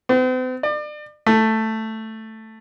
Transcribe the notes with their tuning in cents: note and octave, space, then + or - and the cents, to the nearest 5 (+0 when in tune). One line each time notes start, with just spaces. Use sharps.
C4 -45
D5 +35
A3 +5